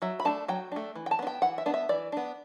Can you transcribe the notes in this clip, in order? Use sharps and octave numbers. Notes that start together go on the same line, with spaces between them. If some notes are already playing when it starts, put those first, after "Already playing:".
F#3 E5
B5
A3 D4 A5
F#3 G5
A3 D4
E3
G5
A5
B3 D4
G5
E3 F#5
E5
B3 D4
E5
E3 D5
B3 D4